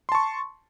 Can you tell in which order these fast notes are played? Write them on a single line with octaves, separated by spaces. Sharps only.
C6 A5 C#6